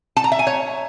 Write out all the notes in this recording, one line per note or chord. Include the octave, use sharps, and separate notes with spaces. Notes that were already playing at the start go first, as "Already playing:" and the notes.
A5
A#5
E5
G#5
C#5